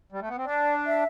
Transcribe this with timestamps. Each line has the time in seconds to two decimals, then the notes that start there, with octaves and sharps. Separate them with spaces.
0.12 G3
0.21 A3
0.28 B3
0.37 C4
0.45 D4 D5
0.87 E5